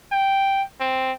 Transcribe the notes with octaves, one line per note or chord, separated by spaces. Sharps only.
G5
C4